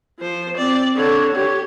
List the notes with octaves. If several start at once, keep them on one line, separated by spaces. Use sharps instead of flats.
F3 C5
C4 D5
D3 C#5
G4 C#5